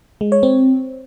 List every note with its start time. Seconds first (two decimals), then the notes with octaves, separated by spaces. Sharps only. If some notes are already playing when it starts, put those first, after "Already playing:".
0.21 G#3
0.32 C#5
0.43 C4